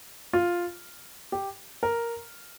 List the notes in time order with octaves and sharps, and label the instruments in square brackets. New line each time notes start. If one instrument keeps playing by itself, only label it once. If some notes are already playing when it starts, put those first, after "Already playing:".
[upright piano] F4
G4
A#4